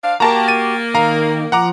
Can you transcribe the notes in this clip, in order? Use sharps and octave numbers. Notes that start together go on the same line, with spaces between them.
D4 C5 F5
A#3 F#4 G4 A#4 A5 A#5
A6 D#7
D#3 F5 A#5
F3 F#5 A#5 D6